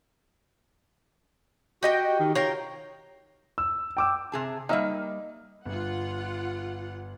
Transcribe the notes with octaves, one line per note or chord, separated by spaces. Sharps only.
F#4 G4 D#5 G5
D#3
F4 A#4 C#5 G5
E6
G5 D6 E6
C3 G#4 A5
G3 A#3 D#4 E5
G1 F4 F#5